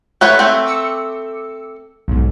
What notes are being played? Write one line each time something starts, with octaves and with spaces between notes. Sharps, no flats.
A3 B4 C#5 F#5
A3 C4
D6 E6 C#7
B1 G#2